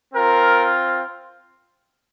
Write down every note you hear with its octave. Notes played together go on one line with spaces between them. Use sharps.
C4 F4 A#4